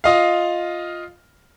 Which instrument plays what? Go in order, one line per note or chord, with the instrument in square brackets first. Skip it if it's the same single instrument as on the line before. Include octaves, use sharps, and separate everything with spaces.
[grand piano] F4 D#5 F5